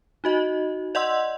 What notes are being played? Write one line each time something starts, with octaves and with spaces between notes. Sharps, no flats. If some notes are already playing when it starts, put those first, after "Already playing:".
D#4 F#4 D#5
D5 D#5 F#5 C6 E6